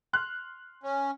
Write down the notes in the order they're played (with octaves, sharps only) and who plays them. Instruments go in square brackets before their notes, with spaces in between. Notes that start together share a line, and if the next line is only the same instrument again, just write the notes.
[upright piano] C6 F6 F#6
[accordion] C#4